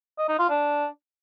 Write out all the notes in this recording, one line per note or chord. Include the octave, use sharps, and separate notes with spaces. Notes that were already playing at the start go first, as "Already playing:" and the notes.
D#5
D#4
F4
D4